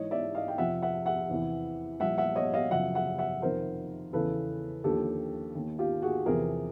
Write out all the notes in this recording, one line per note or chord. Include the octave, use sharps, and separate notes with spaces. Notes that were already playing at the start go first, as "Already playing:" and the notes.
Already playing: G#2 E3 C#5 D#5
D5 E5
D#5 F5
G5
F2 C3 F3 E5 F#5
E5 F#5
E5 F#5
E2 C3 E3
C2 A#2 F3 E5 F#5
E5 F#5
C#5 D#5
D#5 F5
F#2 C#3 F3 E5 F#5
E5 F#5
E5 F#5
F2 C3 D#3 A#4 C5
E2 C#3 E3 A4 B4
D#2 D3 F3 G4 A4
D#2 D#3
F4 G4
F#4 G#4
E2 C3 F3 G#4 A#4